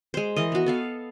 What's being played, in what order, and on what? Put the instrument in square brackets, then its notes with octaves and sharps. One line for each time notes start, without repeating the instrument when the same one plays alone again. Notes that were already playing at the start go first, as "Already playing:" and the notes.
[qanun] G#3 C5
E3 A#4 D#5
B3 F#4
B3 A4 F5